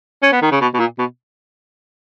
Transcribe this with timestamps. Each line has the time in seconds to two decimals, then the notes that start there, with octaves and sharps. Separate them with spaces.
0.23 C#4
0.32 B3
0.42 D#3
0.52 C#3
0.61 B2
0.74 B2
0.79 A#2
0.99 B2